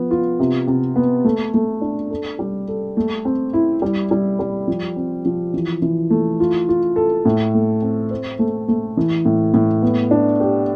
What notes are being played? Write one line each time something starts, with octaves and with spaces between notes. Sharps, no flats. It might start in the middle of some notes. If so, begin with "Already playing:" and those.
Already playing: F3 B3
F4
C3
C3
B3
A3
A3
D4
A4
G3
A4
A3
C4
E4
G3
G3
G3
F3
C4
F3
E3
E3
A3
F4
F4
A4
A2
A3
C4
C5
A3
A3
E3
A2
A2
B3
D4
G4